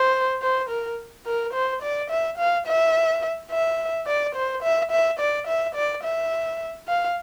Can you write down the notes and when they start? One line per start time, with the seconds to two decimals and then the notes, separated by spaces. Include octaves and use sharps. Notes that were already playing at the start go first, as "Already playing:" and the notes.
Already playing: C5
0.42 C5
0.69 A#4
1.26 A#4
1.54 C5
1.82 D5
2.10 E5
2.38 F5
2.67 E5
3.51 E5
4.07 D5
4.35 C5
4.63 E5
4.91 E5
5.19 D5
5.47 E5
5.75 D5
6.03 E5
6.88 F5